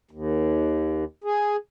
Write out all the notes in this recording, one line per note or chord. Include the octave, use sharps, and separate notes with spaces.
D#2
G#4